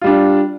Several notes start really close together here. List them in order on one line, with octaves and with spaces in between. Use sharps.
F4 G3 D4